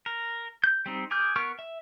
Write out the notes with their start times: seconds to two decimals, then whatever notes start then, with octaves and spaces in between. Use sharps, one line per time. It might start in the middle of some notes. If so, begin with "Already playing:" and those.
0.06 A#4
0.64 G6
0.86 G3 C4 D#4
1.11 G#4 D6 F6 G6
1.36 B3 A#4 C#6 F6
1.59 E5